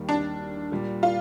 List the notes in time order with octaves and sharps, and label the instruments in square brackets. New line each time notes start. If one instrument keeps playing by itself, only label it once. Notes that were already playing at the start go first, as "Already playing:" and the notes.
Already playing: [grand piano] D#2 D#3 G3
[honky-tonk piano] D4
[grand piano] A#2 G3 D4
[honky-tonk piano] F4